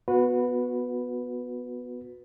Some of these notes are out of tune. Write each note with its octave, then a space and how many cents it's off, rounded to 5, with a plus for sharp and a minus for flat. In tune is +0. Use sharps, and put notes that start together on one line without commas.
B3 +0 F#4 -25 B4 +0